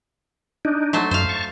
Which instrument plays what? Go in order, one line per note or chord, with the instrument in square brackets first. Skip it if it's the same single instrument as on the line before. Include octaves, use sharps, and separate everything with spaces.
[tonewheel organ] D4 D#4
[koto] F#3 A3 C5
[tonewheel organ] F#2 [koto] C5 F5
[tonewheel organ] A5 C#6